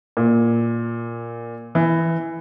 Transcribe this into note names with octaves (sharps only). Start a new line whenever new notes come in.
A#2
E3